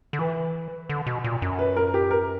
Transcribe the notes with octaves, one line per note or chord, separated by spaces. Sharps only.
D3
E3 B4
D3
B2
A#2
F#2
B4
A#4
G4
A#4